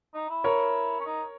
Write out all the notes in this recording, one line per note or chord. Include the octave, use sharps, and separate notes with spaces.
D#4
E4
A#4 C#5
C#4
D#4